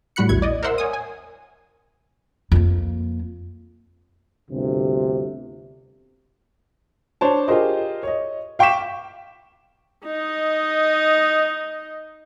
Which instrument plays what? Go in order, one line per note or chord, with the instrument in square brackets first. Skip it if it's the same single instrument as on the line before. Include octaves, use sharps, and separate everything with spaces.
[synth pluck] A2 G3 F#4 B5 F#6 C#7
A#1 E2 E4 G#6
D5 D#5
A#4 C5 E5 F#5 C6 E6
C#5 G#5 D#6
G#5
[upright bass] F2 A#3
[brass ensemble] G1 D2 C3
[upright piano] D4 C5 C#5 A5
F4 G4 G#4 A#4 C5 D#5
C#5 D#5
F5 G5 C#6 D6 B6 E7
[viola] D#4 D#5